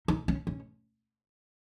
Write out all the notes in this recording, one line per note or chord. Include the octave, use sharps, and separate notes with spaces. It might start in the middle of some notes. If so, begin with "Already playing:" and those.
D#4
C#4
C#4